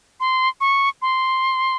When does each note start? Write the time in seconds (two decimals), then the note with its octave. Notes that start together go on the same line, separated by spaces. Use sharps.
0.20 C6
0.61 C#6
1.02 C6